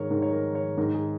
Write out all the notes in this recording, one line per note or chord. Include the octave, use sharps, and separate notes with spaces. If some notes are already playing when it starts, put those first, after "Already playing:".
Already playing: G#2 D#3 A#4 C#5
G#2 D#3 A#4
C#5
A#4
C#5
G#2 D#3 A#4
G#4